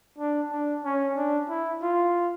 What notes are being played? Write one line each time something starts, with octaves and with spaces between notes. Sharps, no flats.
D4
D4
C#4
D4
E4
F4